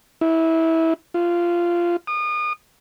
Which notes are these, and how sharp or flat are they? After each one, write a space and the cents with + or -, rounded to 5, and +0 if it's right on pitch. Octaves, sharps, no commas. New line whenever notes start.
E4 -20
F4 -15
D#6 -35